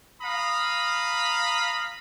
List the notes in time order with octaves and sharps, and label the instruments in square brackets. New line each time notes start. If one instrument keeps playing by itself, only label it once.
[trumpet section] F5 A#5 B5 D#6